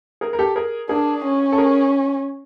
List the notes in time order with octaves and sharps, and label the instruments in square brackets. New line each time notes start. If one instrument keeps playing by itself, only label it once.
[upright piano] G#4 A#4
A#4
G4 A4
G#4 A#4
[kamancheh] D4 [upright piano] G#4 A#4
[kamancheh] C#4
[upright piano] A4
G#4 A#4